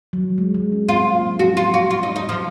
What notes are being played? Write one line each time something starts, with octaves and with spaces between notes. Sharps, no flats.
F#3
G#3
G#3
C#4
C4 F4
A#3
A#3
F#3
F3 F#4
F#3 F4
F#4
F4
D#4
D#4
F3